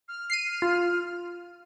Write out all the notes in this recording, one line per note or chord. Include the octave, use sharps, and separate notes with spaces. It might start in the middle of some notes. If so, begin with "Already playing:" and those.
F6
C7 D#7
F4